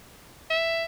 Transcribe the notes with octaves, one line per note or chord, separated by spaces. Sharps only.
E5